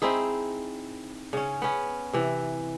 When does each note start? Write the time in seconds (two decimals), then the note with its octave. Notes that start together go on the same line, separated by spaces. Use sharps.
0.02 C4 D#4 E4 G#4
1.33 C#3 C#4
1.62 B3 C#4
2.13 C3 E3